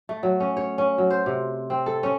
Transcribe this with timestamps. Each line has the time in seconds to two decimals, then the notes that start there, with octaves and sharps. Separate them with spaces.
0.09 A3
0.23 F#3
0.40 C#4
0.57 C#5
0.78 C#4
0.98 F#3
1.10 C5
1.26 C3
1.70 C4
1.86 A4
2.03 C#4